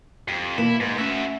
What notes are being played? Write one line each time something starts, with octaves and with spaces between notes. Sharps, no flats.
F2 G4
B2 E3 A#3 E4
G#2 B4
A3 C#4 F#4 E5 G#5